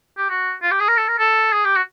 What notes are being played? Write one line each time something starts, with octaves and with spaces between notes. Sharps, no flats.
G4
F#4
F4
G4
G#4
A#4
A4
A#4
A4
G#4
G4
F#4